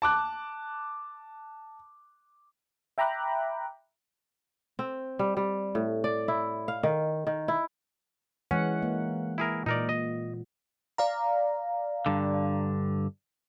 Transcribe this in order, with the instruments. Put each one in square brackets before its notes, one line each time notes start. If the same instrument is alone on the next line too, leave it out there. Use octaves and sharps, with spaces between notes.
[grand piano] A5 D6 F#6
[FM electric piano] E5 G5 A#5 B5 D6 F#6
[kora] C4
G3
G3
A2
D5
E4
F5
D#3
D#3
E4
[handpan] E3 G#3 F#5 [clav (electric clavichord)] C#4
[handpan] A#3
[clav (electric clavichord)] E4 G#4 A#4
[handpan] A#2 [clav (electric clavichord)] D#4 A#4 D5
[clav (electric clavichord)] D#5
[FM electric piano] D5 F5 A#5
[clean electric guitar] G2 D3